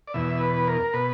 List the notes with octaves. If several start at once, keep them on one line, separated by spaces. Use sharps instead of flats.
D5
E2 B2 E5
B4
A#4
B2 B4